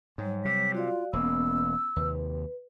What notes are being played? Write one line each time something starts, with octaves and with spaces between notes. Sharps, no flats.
G#2 F#3 G3 C#5
C3 B6
F4 F#4 D5 F5
E1 A#3 B3 C#4 E6
D#2 C3 B4